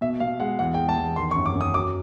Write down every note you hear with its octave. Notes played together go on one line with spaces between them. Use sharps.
B2 E5
B2 F5
G#3 F#5
E2 F#5
G5
G#3
A5
E2
D#3 C6
C#6
F#2
D6
F#2
D#6
F#3 D6